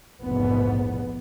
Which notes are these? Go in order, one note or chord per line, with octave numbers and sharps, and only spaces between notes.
F1 A#1 E2 G#2 B3